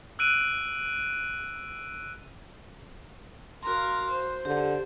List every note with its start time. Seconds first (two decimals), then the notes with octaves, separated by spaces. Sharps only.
0.19 E6 F#6 D7 D#7
3.63 F#4 A#4 F5 C6
4.10 C5
4.45 D3 G4